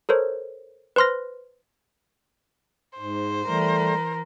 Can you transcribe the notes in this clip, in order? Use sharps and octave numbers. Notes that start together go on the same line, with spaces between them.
A4 A#4 C5 C#5
B4 C5 C6 F6 A#6
G#2 C5
E3 G3 A3 A#4